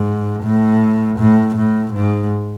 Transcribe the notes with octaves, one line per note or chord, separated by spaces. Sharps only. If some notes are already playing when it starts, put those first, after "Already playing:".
Already playing: G#2
A2
A2
A2
G#2